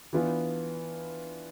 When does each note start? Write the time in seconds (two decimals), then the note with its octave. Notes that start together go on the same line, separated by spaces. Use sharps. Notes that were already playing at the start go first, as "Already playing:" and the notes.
0.13 E3 B3 D4 F4